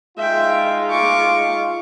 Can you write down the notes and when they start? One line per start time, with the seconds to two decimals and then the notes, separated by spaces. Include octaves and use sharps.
0.18 G#3 D#4 F4 E5 G5
0.90 C#6 D6